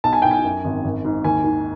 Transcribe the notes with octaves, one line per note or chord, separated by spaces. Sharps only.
B1 A5
G#5
B1 G5
G#5
F#2
G#1
G#1
G#2
D#2 G#5
D#3